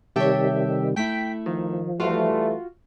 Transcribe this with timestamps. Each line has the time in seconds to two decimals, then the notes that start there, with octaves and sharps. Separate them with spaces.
0.16 C3 D#3 G3 G4 A4 C#5 E5 G5
0.96 A3 E4 G5 B6
1.46 D#3 F3
2.00 E3 G3 A3 F4 F#4 F5